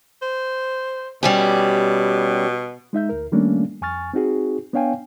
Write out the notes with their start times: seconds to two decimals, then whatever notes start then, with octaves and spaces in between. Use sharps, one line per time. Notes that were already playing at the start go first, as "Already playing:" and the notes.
0.22 C5
1.23 B2 G3 C#4 G4
2.93 G#3 D#4 E5 G6
3.09 D2 A#4
3.32 D#3 G3 A3 A#3 C#4 D4
3.82 F2 G#5 C#6 F6 A6
4.14 C4 D#4 F#4 G#4
4.73 B3 D4 C#5 F5 G5 G#5